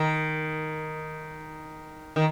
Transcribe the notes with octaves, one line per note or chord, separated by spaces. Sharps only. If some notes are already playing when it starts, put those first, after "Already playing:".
Already playing: D#3
D#3